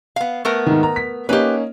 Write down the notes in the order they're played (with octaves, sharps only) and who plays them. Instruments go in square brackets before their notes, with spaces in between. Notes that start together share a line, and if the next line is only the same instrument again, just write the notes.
[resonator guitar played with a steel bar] B3 F5
A3 B3 A#4
[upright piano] G#2 D#3
A#5
B6
[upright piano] A#3 C#4 D#4 [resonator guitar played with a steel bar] G4 B4